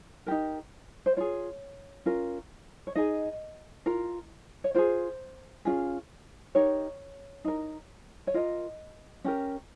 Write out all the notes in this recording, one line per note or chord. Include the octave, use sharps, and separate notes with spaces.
D#4 G4 A#4
C5
F4 G#4 C#5
C#4 F4 A#4
C#5
D#4 G#4 D#5
F4 A#4
C#5
F4 G#4 C5
C#4 F4 G#4
D#4 G4 A#4 C#5
D#4 A#4
C#5
F4 A#4 D#5
C#4 G4 A#4